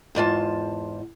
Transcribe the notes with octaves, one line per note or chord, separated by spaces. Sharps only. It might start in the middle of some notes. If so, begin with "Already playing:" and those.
E2 G#2 F4 A5